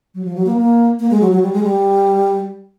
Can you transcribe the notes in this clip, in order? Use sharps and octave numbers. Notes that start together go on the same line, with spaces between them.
F#3
F3
F#3
A#3
A#3
A#3
G#3
F#3
F#3
G3
G#3
G3